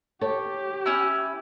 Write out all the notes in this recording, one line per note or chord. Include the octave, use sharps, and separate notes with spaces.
G4 A4 C#5
C#4 E4